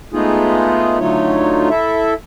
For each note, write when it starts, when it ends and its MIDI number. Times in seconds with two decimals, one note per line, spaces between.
0.13 0.99 56
0.13 0.99 57
0.13 0.99 59
0.13 0.99 63
0.13 0.99 65
0.13 0.99 68
1.00 1.69 50
1.00 1.69 54
1.00 1.69 57
1.00 1.69 63
1.00 1.69 65
1.00 1.69 73
1.70 2.14 64
1.70 2.14 69
1.70 2.14 76